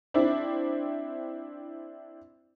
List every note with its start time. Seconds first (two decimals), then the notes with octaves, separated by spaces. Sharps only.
0.14 C4 D4 E4